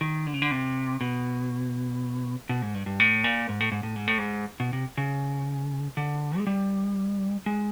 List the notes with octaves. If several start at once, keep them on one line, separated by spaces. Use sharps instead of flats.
D#3
D3
C#3
D3
C3
B2
B2
G#2
G2
G2
A2
A#2
G#2
A2
G#2
A2
G#2
A2
G#2
B2
C3
C#3
D3
G#3
G3
G#3